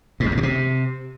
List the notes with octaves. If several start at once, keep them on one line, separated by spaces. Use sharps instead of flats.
G#2
F2
G#2
B2
C3